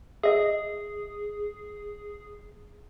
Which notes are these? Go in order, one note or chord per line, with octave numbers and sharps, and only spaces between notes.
G#4 D#5 E5